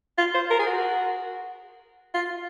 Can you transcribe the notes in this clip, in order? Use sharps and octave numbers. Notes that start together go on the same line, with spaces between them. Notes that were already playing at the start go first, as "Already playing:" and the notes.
F4
C5
A#4
G#4
F#4
F4